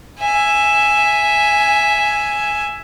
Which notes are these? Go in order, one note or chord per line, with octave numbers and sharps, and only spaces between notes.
E5 G#5